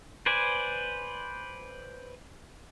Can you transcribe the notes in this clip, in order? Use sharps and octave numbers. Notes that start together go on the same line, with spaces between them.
B4 C5 D5 G#5